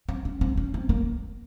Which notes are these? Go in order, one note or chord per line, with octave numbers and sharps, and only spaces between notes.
C4
C#4
C4
C#4
C4
A#3